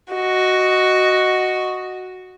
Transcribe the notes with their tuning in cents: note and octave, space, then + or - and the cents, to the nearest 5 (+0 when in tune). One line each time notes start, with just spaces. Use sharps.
F#4 +0 D#5 +0